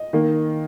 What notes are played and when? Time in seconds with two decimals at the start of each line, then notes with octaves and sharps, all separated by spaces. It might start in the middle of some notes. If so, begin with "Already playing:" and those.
Already playing: D#5
0.13 D#3 A#3